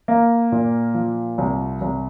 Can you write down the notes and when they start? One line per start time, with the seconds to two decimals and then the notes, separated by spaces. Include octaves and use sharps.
0.08 A#3
0.52 A#2
0.94 F3
1.38 C2
1.81 C2